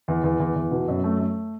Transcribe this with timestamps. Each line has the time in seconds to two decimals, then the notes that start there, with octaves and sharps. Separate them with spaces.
0.08 E2
0.24 E2
0.40 E2
0.56 E2
0.71 B2
0.88 F#2
1.04 A3
1.19 A3